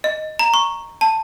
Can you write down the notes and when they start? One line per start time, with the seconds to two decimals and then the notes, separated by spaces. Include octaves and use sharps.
0.04 D#5
0.39 A#5
0.54 C#6
1.01 A5